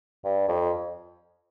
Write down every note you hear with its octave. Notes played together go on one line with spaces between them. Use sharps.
G2
F2